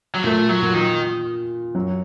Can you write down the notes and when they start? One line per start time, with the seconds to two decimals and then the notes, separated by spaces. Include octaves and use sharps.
0.15 F#3
0.23 A#2 A3 A#3
0.49 F#3
0.62 A#2 A#3
0.74 D#3
1.75 F#2 F#3